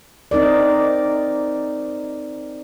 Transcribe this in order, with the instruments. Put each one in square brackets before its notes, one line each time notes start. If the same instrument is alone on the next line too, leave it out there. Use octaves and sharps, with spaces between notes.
[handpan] C4 D#4 A#4 D5